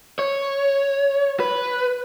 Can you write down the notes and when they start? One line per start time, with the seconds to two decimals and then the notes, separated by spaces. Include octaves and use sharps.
0.19 C#5
1.40 B4